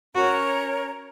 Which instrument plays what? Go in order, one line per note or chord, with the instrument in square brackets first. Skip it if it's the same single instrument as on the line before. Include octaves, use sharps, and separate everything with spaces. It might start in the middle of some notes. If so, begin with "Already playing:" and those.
[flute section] C#4 A#4 C#5 A#5 [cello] F#4